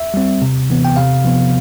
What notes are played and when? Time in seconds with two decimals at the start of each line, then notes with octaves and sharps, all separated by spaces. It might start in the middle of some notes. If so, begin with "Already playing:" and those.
Already playing: E5
0.14 G3 C4
0.42 C3
0.70 E3 B3
0.85 G5
0.96 C3 F5
1.24 F3 B3